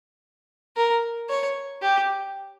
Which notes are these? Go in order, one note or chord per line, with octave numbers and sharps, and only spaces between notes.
A#4
C#5
G4